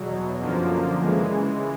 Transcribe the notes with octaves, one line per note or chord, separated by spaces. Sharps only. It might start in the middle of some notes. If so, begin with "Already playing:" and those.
Already playing: E2 B2 F#3
F#2 D3 F3 A#3
C#3 E3 G#3